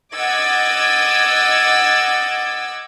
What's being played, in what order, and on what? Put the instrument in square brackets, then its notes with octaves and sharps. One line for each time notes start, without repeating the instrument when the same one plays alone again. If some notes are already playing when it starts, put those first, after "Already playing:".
[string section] D#5 F#5 D6 E6 G#6 A6